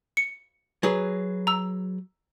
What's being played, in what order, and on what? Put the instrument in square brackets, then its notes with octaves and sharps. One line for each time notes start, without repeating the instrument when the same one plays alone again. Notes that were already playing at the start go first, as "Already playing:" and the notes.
[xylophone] C#7
[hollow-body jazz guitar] F#3 G#4 B4
[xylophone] A#5 E6